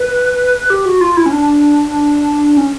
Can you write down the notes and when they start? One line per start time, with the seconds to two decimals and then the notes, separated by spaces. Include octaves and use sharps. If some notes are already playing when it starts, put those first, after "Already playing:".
Already playing: B4
0.70 G4
0.85 F#4
1.01 F4
1.17 E4
1.26 C#4
1.33 D4
2.57 C#4